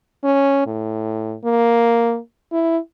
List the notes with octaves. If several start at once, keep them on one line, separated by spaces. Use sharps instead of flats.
C#4
A2
A#3
E4